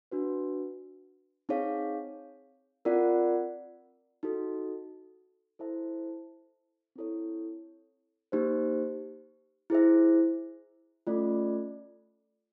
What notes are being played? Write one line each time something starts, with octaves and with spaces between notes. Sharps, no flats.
D4 F#4 B4
C4 D#4 G#4 C#5 F5
C4 F4 A#4 D5 F#5
D#4 F#4 A4
E4 A4 C5 E5 A5
C4 E4 A4 C#5
A#3 D#4 G4 C5
E4 G#4 C5 E5
A3 C#4 F4 A4 D5